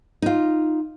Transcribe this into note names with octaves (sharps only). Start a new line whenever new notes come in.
D#4 F4